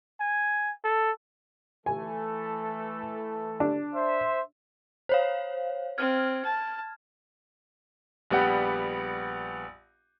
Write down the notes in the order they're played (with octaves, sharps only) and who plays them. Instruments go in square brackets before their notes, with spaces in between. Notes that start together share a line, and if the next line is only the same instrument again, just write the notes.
[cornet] G#5
A4
[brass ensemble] E3 A3 A4 [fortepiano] G#5
[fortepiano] D4
[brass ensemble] C5 E5
[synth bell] C5 C#5 F5
[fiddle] C4 [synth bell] F6 G#6
[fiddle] A5
[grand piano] A#1 G3 B3 G4 F#5